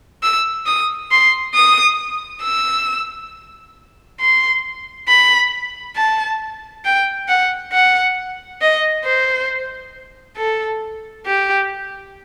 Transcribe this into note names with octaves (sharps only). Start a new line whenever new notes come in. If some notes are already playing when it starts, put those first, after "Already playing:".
E6
D#6
C6
D#6
E6
C6
B5
A5
G5
F#5
F#5
D#5
C5
A4
G4